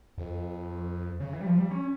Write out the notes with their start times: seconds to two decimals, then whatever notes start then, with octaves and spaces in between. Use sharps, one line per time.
0.18 F2
1.20 C#3
1.33 E3
1.41 G3
1.46 F3
1.58 G3
1.71 C#4